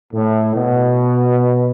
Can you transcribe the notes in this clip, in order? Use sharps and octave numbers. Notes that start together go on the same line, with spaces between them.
A2
B2